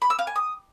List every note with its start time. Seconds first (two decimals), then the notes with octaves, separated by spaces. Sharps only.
0.02 B5
0.10 E6
0.19 F5
0.27 G#5
0.36 D#6